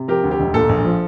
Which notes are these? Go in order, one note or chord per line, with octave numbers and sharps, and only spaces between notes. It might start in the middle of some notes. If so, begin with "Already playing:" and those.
Already playing: C3
F3 G4 A#4
D2
G4
E1
A#2 A4
A#1
F3